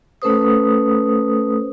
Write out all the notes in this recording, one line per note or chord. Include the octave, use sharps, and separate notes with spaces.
A3 C#4 A4 B4 C5 D#6